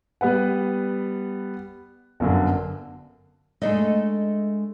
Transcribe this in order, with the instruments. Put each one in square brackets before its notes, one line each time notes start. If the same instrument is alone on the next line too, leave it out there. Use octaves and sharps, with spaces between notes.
[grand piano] G3 B3 B4 F#5
G1 F#2 D3
[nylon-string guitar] G#3 D#5 [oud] A3 D4 D#4